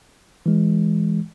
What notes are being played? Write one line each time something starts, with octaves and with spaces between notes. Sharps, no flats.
E3 G#3